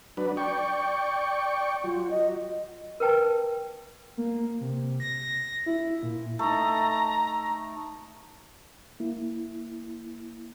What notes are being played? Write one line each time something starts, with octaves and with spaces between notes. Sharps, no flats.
F#3 D4 B4
D5 G5 C#6
F#3 F4
D#5
A#4 B4 G5 A5
A#3
C3
A#6
E4
A#2
A3 D#4 A#5
A#3 E4